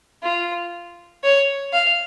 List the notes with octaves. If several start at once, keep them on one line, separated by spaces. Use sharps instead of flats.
F4
C#5
F5